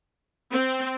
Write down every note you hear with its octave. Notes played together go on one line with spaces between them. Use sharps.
C4